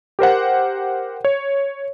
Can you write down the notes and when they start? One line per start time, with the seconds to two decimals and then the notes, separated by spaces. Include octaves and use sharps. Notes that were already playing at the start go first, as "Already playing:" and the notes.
0.19 G4 A#4 C5 F#5
1.25 C#5